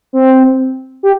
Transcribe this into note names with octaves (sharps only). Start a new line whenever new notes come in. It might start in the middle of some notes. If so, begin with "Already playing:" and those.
C4
G4